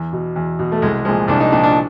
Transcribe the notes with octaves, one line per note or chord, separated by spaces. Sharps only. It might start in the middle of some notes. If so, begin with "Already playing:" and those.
Already playing: E2
B2
E2
B2
A3
C2 G#3
A#2 F3 G#3
C2 D4
D#4
A#2 F3 D4
D4